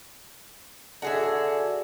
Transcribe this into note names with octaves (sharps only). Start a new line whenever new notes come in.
D3 F#4 G#4 E5